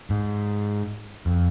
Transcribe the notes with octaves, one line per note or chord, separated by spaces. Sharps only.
G#2
F2